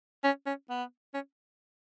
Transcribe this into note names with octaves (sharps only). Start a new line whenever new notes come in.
C#4
C#4
B3
C#4